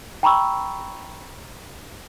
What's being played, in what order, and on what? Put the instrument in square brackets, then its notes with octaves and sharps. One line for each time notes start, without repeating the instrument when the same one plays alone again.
[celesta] G5 A#5 B5 C#6 E6